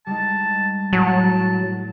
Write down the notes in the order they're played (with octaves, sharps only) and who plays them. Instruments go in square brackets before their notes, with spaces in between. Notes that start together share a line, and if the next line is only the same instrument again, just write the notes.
[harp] G3 G#3 D#4 [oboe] A5
[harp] A2 [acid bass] F#3 [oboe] A5